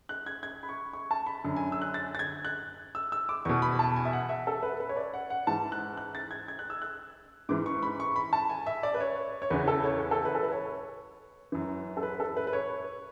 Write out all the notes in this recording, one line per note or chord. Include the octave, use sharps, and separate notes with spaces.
F#6
G#6
G#6
B5
C#6
C#6
A5
B5
F#2 D3
G#5
E6
F#6
A6
A6
G#6
F#6
E6
E6
D6
E2 B2 C#6
B5
A5
G#5
E5
F#5
E5
A4
B4
B4
C#5
D5
F#5
F#5
G#2 E3 A5
F#6
F#6
A6
G#6
G#6
F#6
E6
F#6
G#2 E3 D6
C#6
B5
C#6
B5
A5
G#5
E5
D5
B4
C#5
C#5
E2 C#3 E3 B4
A4
C#5
B4
A4
B4
A4
B4
C#5
F#2 E3
A4
B4
A4
B4
B4
C#5